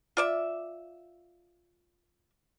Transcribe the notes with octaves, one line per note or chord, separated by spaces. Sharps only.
F4 D5 E5